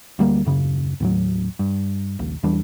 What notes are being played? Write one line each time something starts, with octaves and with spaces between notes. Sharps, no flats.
D2 G3 A#3
D#1 F#2 C#3
D#2 A2 F#3
G2
A#1 D#2
E2 E3 G3 D4